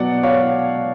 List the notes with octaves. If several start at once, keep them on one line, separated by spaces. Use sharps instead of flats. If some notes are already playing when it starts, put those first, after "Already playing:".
Already playing: B2 F#3 D5 F#5
C#5 F5